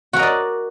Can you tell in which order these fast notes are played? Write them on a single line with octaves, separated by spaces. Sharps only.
F#4 A#4 D#5 D5